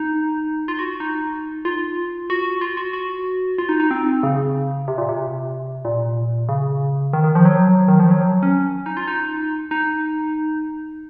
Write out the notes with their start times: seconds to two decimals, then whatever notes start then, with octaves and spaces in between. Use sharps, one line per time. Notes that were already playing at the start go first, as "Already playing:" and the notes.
Already playing: D#4
0.68 F4
0.79 F#4
1.00 D#4
1.65 F4
2.30 F#4
2.61 F4
2.77 F#4
2.93 F#4
3.58 F4
3.69 D#4
3.80 D#4
3.91 C4
4.23 C#3
4.88 C3
4.98 A#2
5.09 C3
5.85 A#2
6.49 C#3
7.13 D#3
7.24 D#3
7.35 F3
7.45 F#3
7.88 D#3
8.00 F3
8.11 F#3
8.43 C#4
8.86 D#4
8.97 F4
9.08 D#4
9.71 D#4